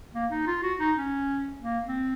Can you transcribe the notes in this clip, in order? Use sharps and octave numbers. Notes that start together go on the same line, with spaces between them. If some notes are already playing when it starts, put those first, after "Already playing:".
A#3
D#4
F4
F#4
D#4
C#4
A#3
C4